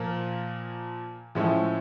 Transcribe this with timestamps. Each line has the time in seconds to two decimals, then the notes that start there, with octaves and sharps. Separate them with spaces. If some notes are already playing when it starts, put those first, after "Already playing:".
Already playing: A#2 F3 A#3
1.35 A2 F3 G#3 C#4 E4